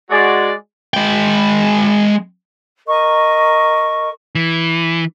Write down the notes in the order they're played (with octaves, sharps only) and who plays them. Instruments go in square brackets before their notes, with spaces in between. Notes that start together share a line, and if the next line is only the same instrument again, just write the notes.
[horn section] G#3 F#4 D5
[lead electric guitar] G#3 G5
[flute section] A#4 D#5 C#6
[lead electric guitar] E3